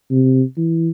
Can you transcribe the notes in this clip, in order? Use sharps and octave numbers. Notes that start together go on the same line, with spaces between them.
C3
E3